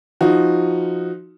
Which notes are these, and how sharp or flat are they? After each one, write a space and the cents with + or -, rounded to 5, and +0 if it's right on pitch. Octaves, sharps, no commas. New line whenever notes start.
F3 +0 D#4 +0 F#4 +0